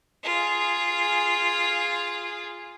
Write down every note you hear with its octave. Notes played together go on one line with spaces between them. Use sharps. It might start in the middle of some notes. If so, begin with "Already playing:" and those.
F4 G#4